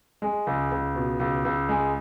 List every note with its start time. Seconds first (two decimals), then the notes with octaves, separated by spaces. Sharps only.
0.22 G#3
0.47 C#2
0.71 C#2
0.95 B2
1.20 C#2
1.45 C#2
1.69 G#3